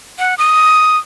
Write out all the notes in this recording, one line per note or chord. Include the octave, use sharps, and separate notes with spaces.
F#5
D#6